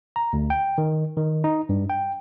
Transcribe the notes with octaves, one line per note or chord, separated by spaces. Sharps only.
A#5
D2
G5
D#3
D#3
D#4
G2
G5